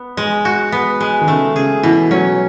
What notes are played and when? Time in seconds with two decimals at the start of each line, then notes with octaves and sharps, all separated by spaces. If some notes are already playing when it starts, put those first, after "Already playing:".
Already playing: B3
0.17 G#3
0.45 F#4
0.72 B3
1.00 G#3
1.21 D#3
1.28 C#3 A3
1.56 C#3 G#4
1.83 B2 E3
2.11 F#3 C#4